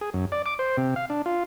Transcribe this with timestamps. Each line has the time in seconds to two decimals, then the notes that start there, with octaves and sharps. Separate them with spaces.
0.01 G#4
0.14 F#2
0.32 D5
0.46 D6
0.59 C5
0.77 C3
0.96 F5
1.10 D4
1.26 F4